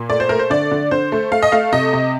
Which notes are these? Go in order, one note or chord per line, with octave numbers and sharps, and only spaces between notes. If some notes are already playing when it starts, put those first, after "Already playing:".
Already playing: A#2
A3 D5
C5
A3 A#4
C5
D3 D5
D3
D3 C5
A3
A3 F5
D#5
A3 F5
C3 D#5
C3